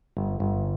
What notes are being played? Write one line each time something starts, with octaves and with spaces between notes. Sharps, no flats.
G1
G1